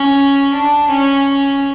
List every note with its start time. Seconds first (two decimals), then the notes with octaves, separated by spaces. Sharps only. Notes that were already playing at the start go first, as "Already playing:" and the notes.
Already playing: C#4
0.52 D4
0.88 C#4